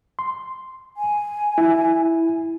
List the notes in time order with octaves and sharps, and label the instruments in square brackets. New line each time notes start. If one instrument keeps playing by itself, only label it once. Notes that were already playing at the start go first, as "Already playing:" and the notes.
[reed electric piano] C6
[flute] G#5
[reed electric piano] E4